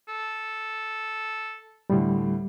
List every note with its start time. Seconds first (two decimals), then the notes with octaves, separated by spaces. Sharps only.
0.08 A4
1.90 D2 A2 G3